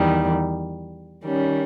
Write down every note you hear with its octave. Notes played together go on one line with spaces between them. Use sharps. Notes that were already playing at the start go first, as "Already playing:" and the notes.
Already playing: E2 D#3 G3
D#3 G3 C#4